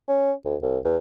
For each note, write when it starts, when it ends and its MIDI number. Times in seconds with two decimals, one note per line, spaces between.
0.08 0.32 61
0.45 0.56 38
0.62 0.78 36
0.84 0.97 40